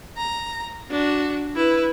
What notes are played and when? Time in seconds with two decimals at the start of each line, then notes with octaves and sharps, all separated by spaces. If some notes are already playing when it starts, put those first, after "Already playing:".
0.17 A#5
0.90 D4 F#4
1.56 E4 B4